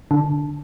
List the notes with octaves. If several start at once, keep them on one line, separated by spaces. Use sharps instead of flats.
D3